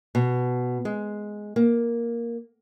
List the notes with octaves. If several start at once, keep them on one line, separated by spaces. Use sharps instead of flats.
B2
G#3
A#3